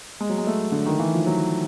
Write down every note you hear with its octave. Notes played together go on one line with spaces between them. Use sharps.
G#3
F#3
G#3
A3
D3
D#3
E3
F3
F#3